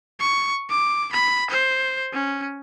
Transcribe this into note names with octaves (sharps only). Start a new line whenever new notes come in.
C#6
D6
B5
C5
C#4